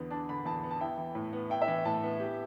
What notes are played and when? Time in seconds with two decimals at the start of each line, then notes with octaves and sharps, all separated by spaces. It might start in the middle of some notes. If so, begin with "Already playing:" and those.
Already playing: E2 D3 B3
0.10 D4 A5
0.29 D3 B5
0.45 E2 A5
0.63 B3
0.71 A5
0.81 E4 G5
0.98 E3
1.15 A2
1.33 B3
1.50 E4 G5
1.62 E5
1.68 E3
1.85 A2 A5
2.03 B3
2.20 G4